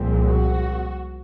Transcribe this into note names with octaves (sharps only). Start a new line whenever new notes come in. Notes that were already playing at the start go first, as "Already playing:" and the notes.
Already playing: C2 A#2 F3 G#3 C4
F#4